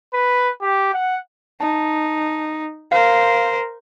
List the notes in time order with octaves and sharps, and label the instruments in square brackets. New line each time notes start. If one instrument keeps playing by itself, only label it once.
[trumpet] B4
G4
F#5
[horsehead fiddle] D#4 [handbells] A5
[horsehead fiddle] A#4 C5 [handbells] F5